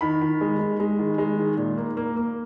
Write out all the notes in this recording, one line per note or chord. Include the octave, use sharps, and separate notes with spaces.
D#3 B5
D#3
G#3
G#3
G#3
D#3
G#3
D#3
A#2
A#3
A#3
A#3